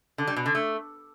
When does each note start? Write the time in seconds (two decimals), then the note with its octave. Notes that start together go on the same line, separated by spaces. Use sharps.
0.18 D3
0.27 G3
0.36 B2
0.46 D3
0.55 A3